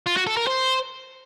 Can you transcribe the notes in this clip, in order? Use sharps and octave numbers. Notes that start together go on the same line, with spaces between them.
F4
F#4
A4
A#4
C5